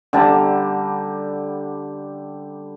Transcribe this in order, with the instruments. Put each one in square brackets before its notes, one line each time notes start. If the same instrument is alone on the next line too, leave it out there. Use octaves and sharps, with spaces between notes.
[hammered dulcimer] D3 G3 A5 A#5